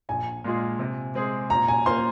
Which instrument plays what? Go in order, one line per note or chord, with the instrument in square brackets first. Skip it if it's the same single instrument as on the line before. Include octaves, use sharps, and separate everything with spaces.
[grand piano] A#1 [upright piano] G#5
[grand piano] A#2 G#3 F4 G#4
C3
G#3 C4 G#4
[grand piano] A#2 [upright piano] A#5
[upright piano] G#5
[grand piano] A#3 F4 C5 F5 [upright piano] C6